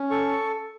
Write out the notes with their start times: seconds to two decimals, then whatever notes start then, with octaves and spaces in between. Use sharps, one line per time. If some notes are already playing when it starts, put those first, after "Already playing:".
Already playing: C#4
0.11 A4 C#6